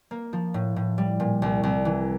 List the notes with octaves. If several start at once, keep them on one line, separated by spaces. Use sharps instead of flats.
A#3
F3
A2
A2
G3
A#2
C2
C2
E3